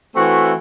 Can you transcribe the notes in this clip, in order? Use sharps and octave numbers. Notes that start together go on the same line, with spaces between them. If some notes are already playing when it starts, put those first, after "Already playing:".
E3 A3 C4 F#4